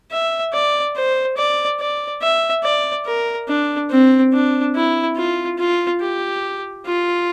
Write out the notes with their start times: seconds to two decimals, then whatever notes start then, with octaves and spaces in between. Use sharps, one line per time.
0.12 E5
0.53 D5
0.96 C5
1.37 D5
1.80 D5
2.22 E5
2.64 D5
3.06 A#4
3.48 D4
3.91 C4
4.33 D4
4.75 E4
5.17 F4
5.59 F4
6.01 G4
6.86 F4